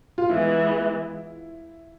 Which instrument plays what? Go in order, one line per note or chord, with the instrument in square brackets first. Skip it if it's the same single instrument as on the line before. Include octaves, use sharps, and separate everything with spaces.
[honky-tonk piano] F4
[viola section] E3 G#3 B3 [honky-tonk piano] E4